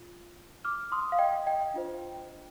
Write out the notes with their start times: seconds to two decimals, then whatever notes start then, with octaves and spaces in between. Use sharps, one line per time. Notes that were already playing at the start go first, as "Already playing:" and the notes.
Already playing: F4
0.65 D6 F6
0.92 C6 D#6
1.12 F5
1.19 D#5 G5
1.47 D#5 G5
1.74 D4 F4 C5